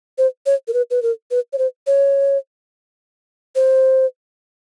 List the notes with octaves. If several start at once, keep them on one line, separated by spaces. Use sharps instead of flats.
C5
C#5
A#4
B4
B4
A#4
B4
C#5
C5
C#5
C5